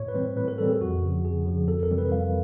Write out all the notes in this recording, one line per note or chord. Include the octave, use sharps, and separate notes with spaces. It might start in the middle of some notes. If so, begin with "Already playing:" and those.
Already playing: A2 C#5
B4
E3 G3 C4 C5
A2 B4
A#4
E3 G3 C4 A4
G#4
F2 F#4
C#3 F3
F2 G#4
C#3 F3
F2 A4
A#4
C3 E3 G3 C4
B4
F2 F5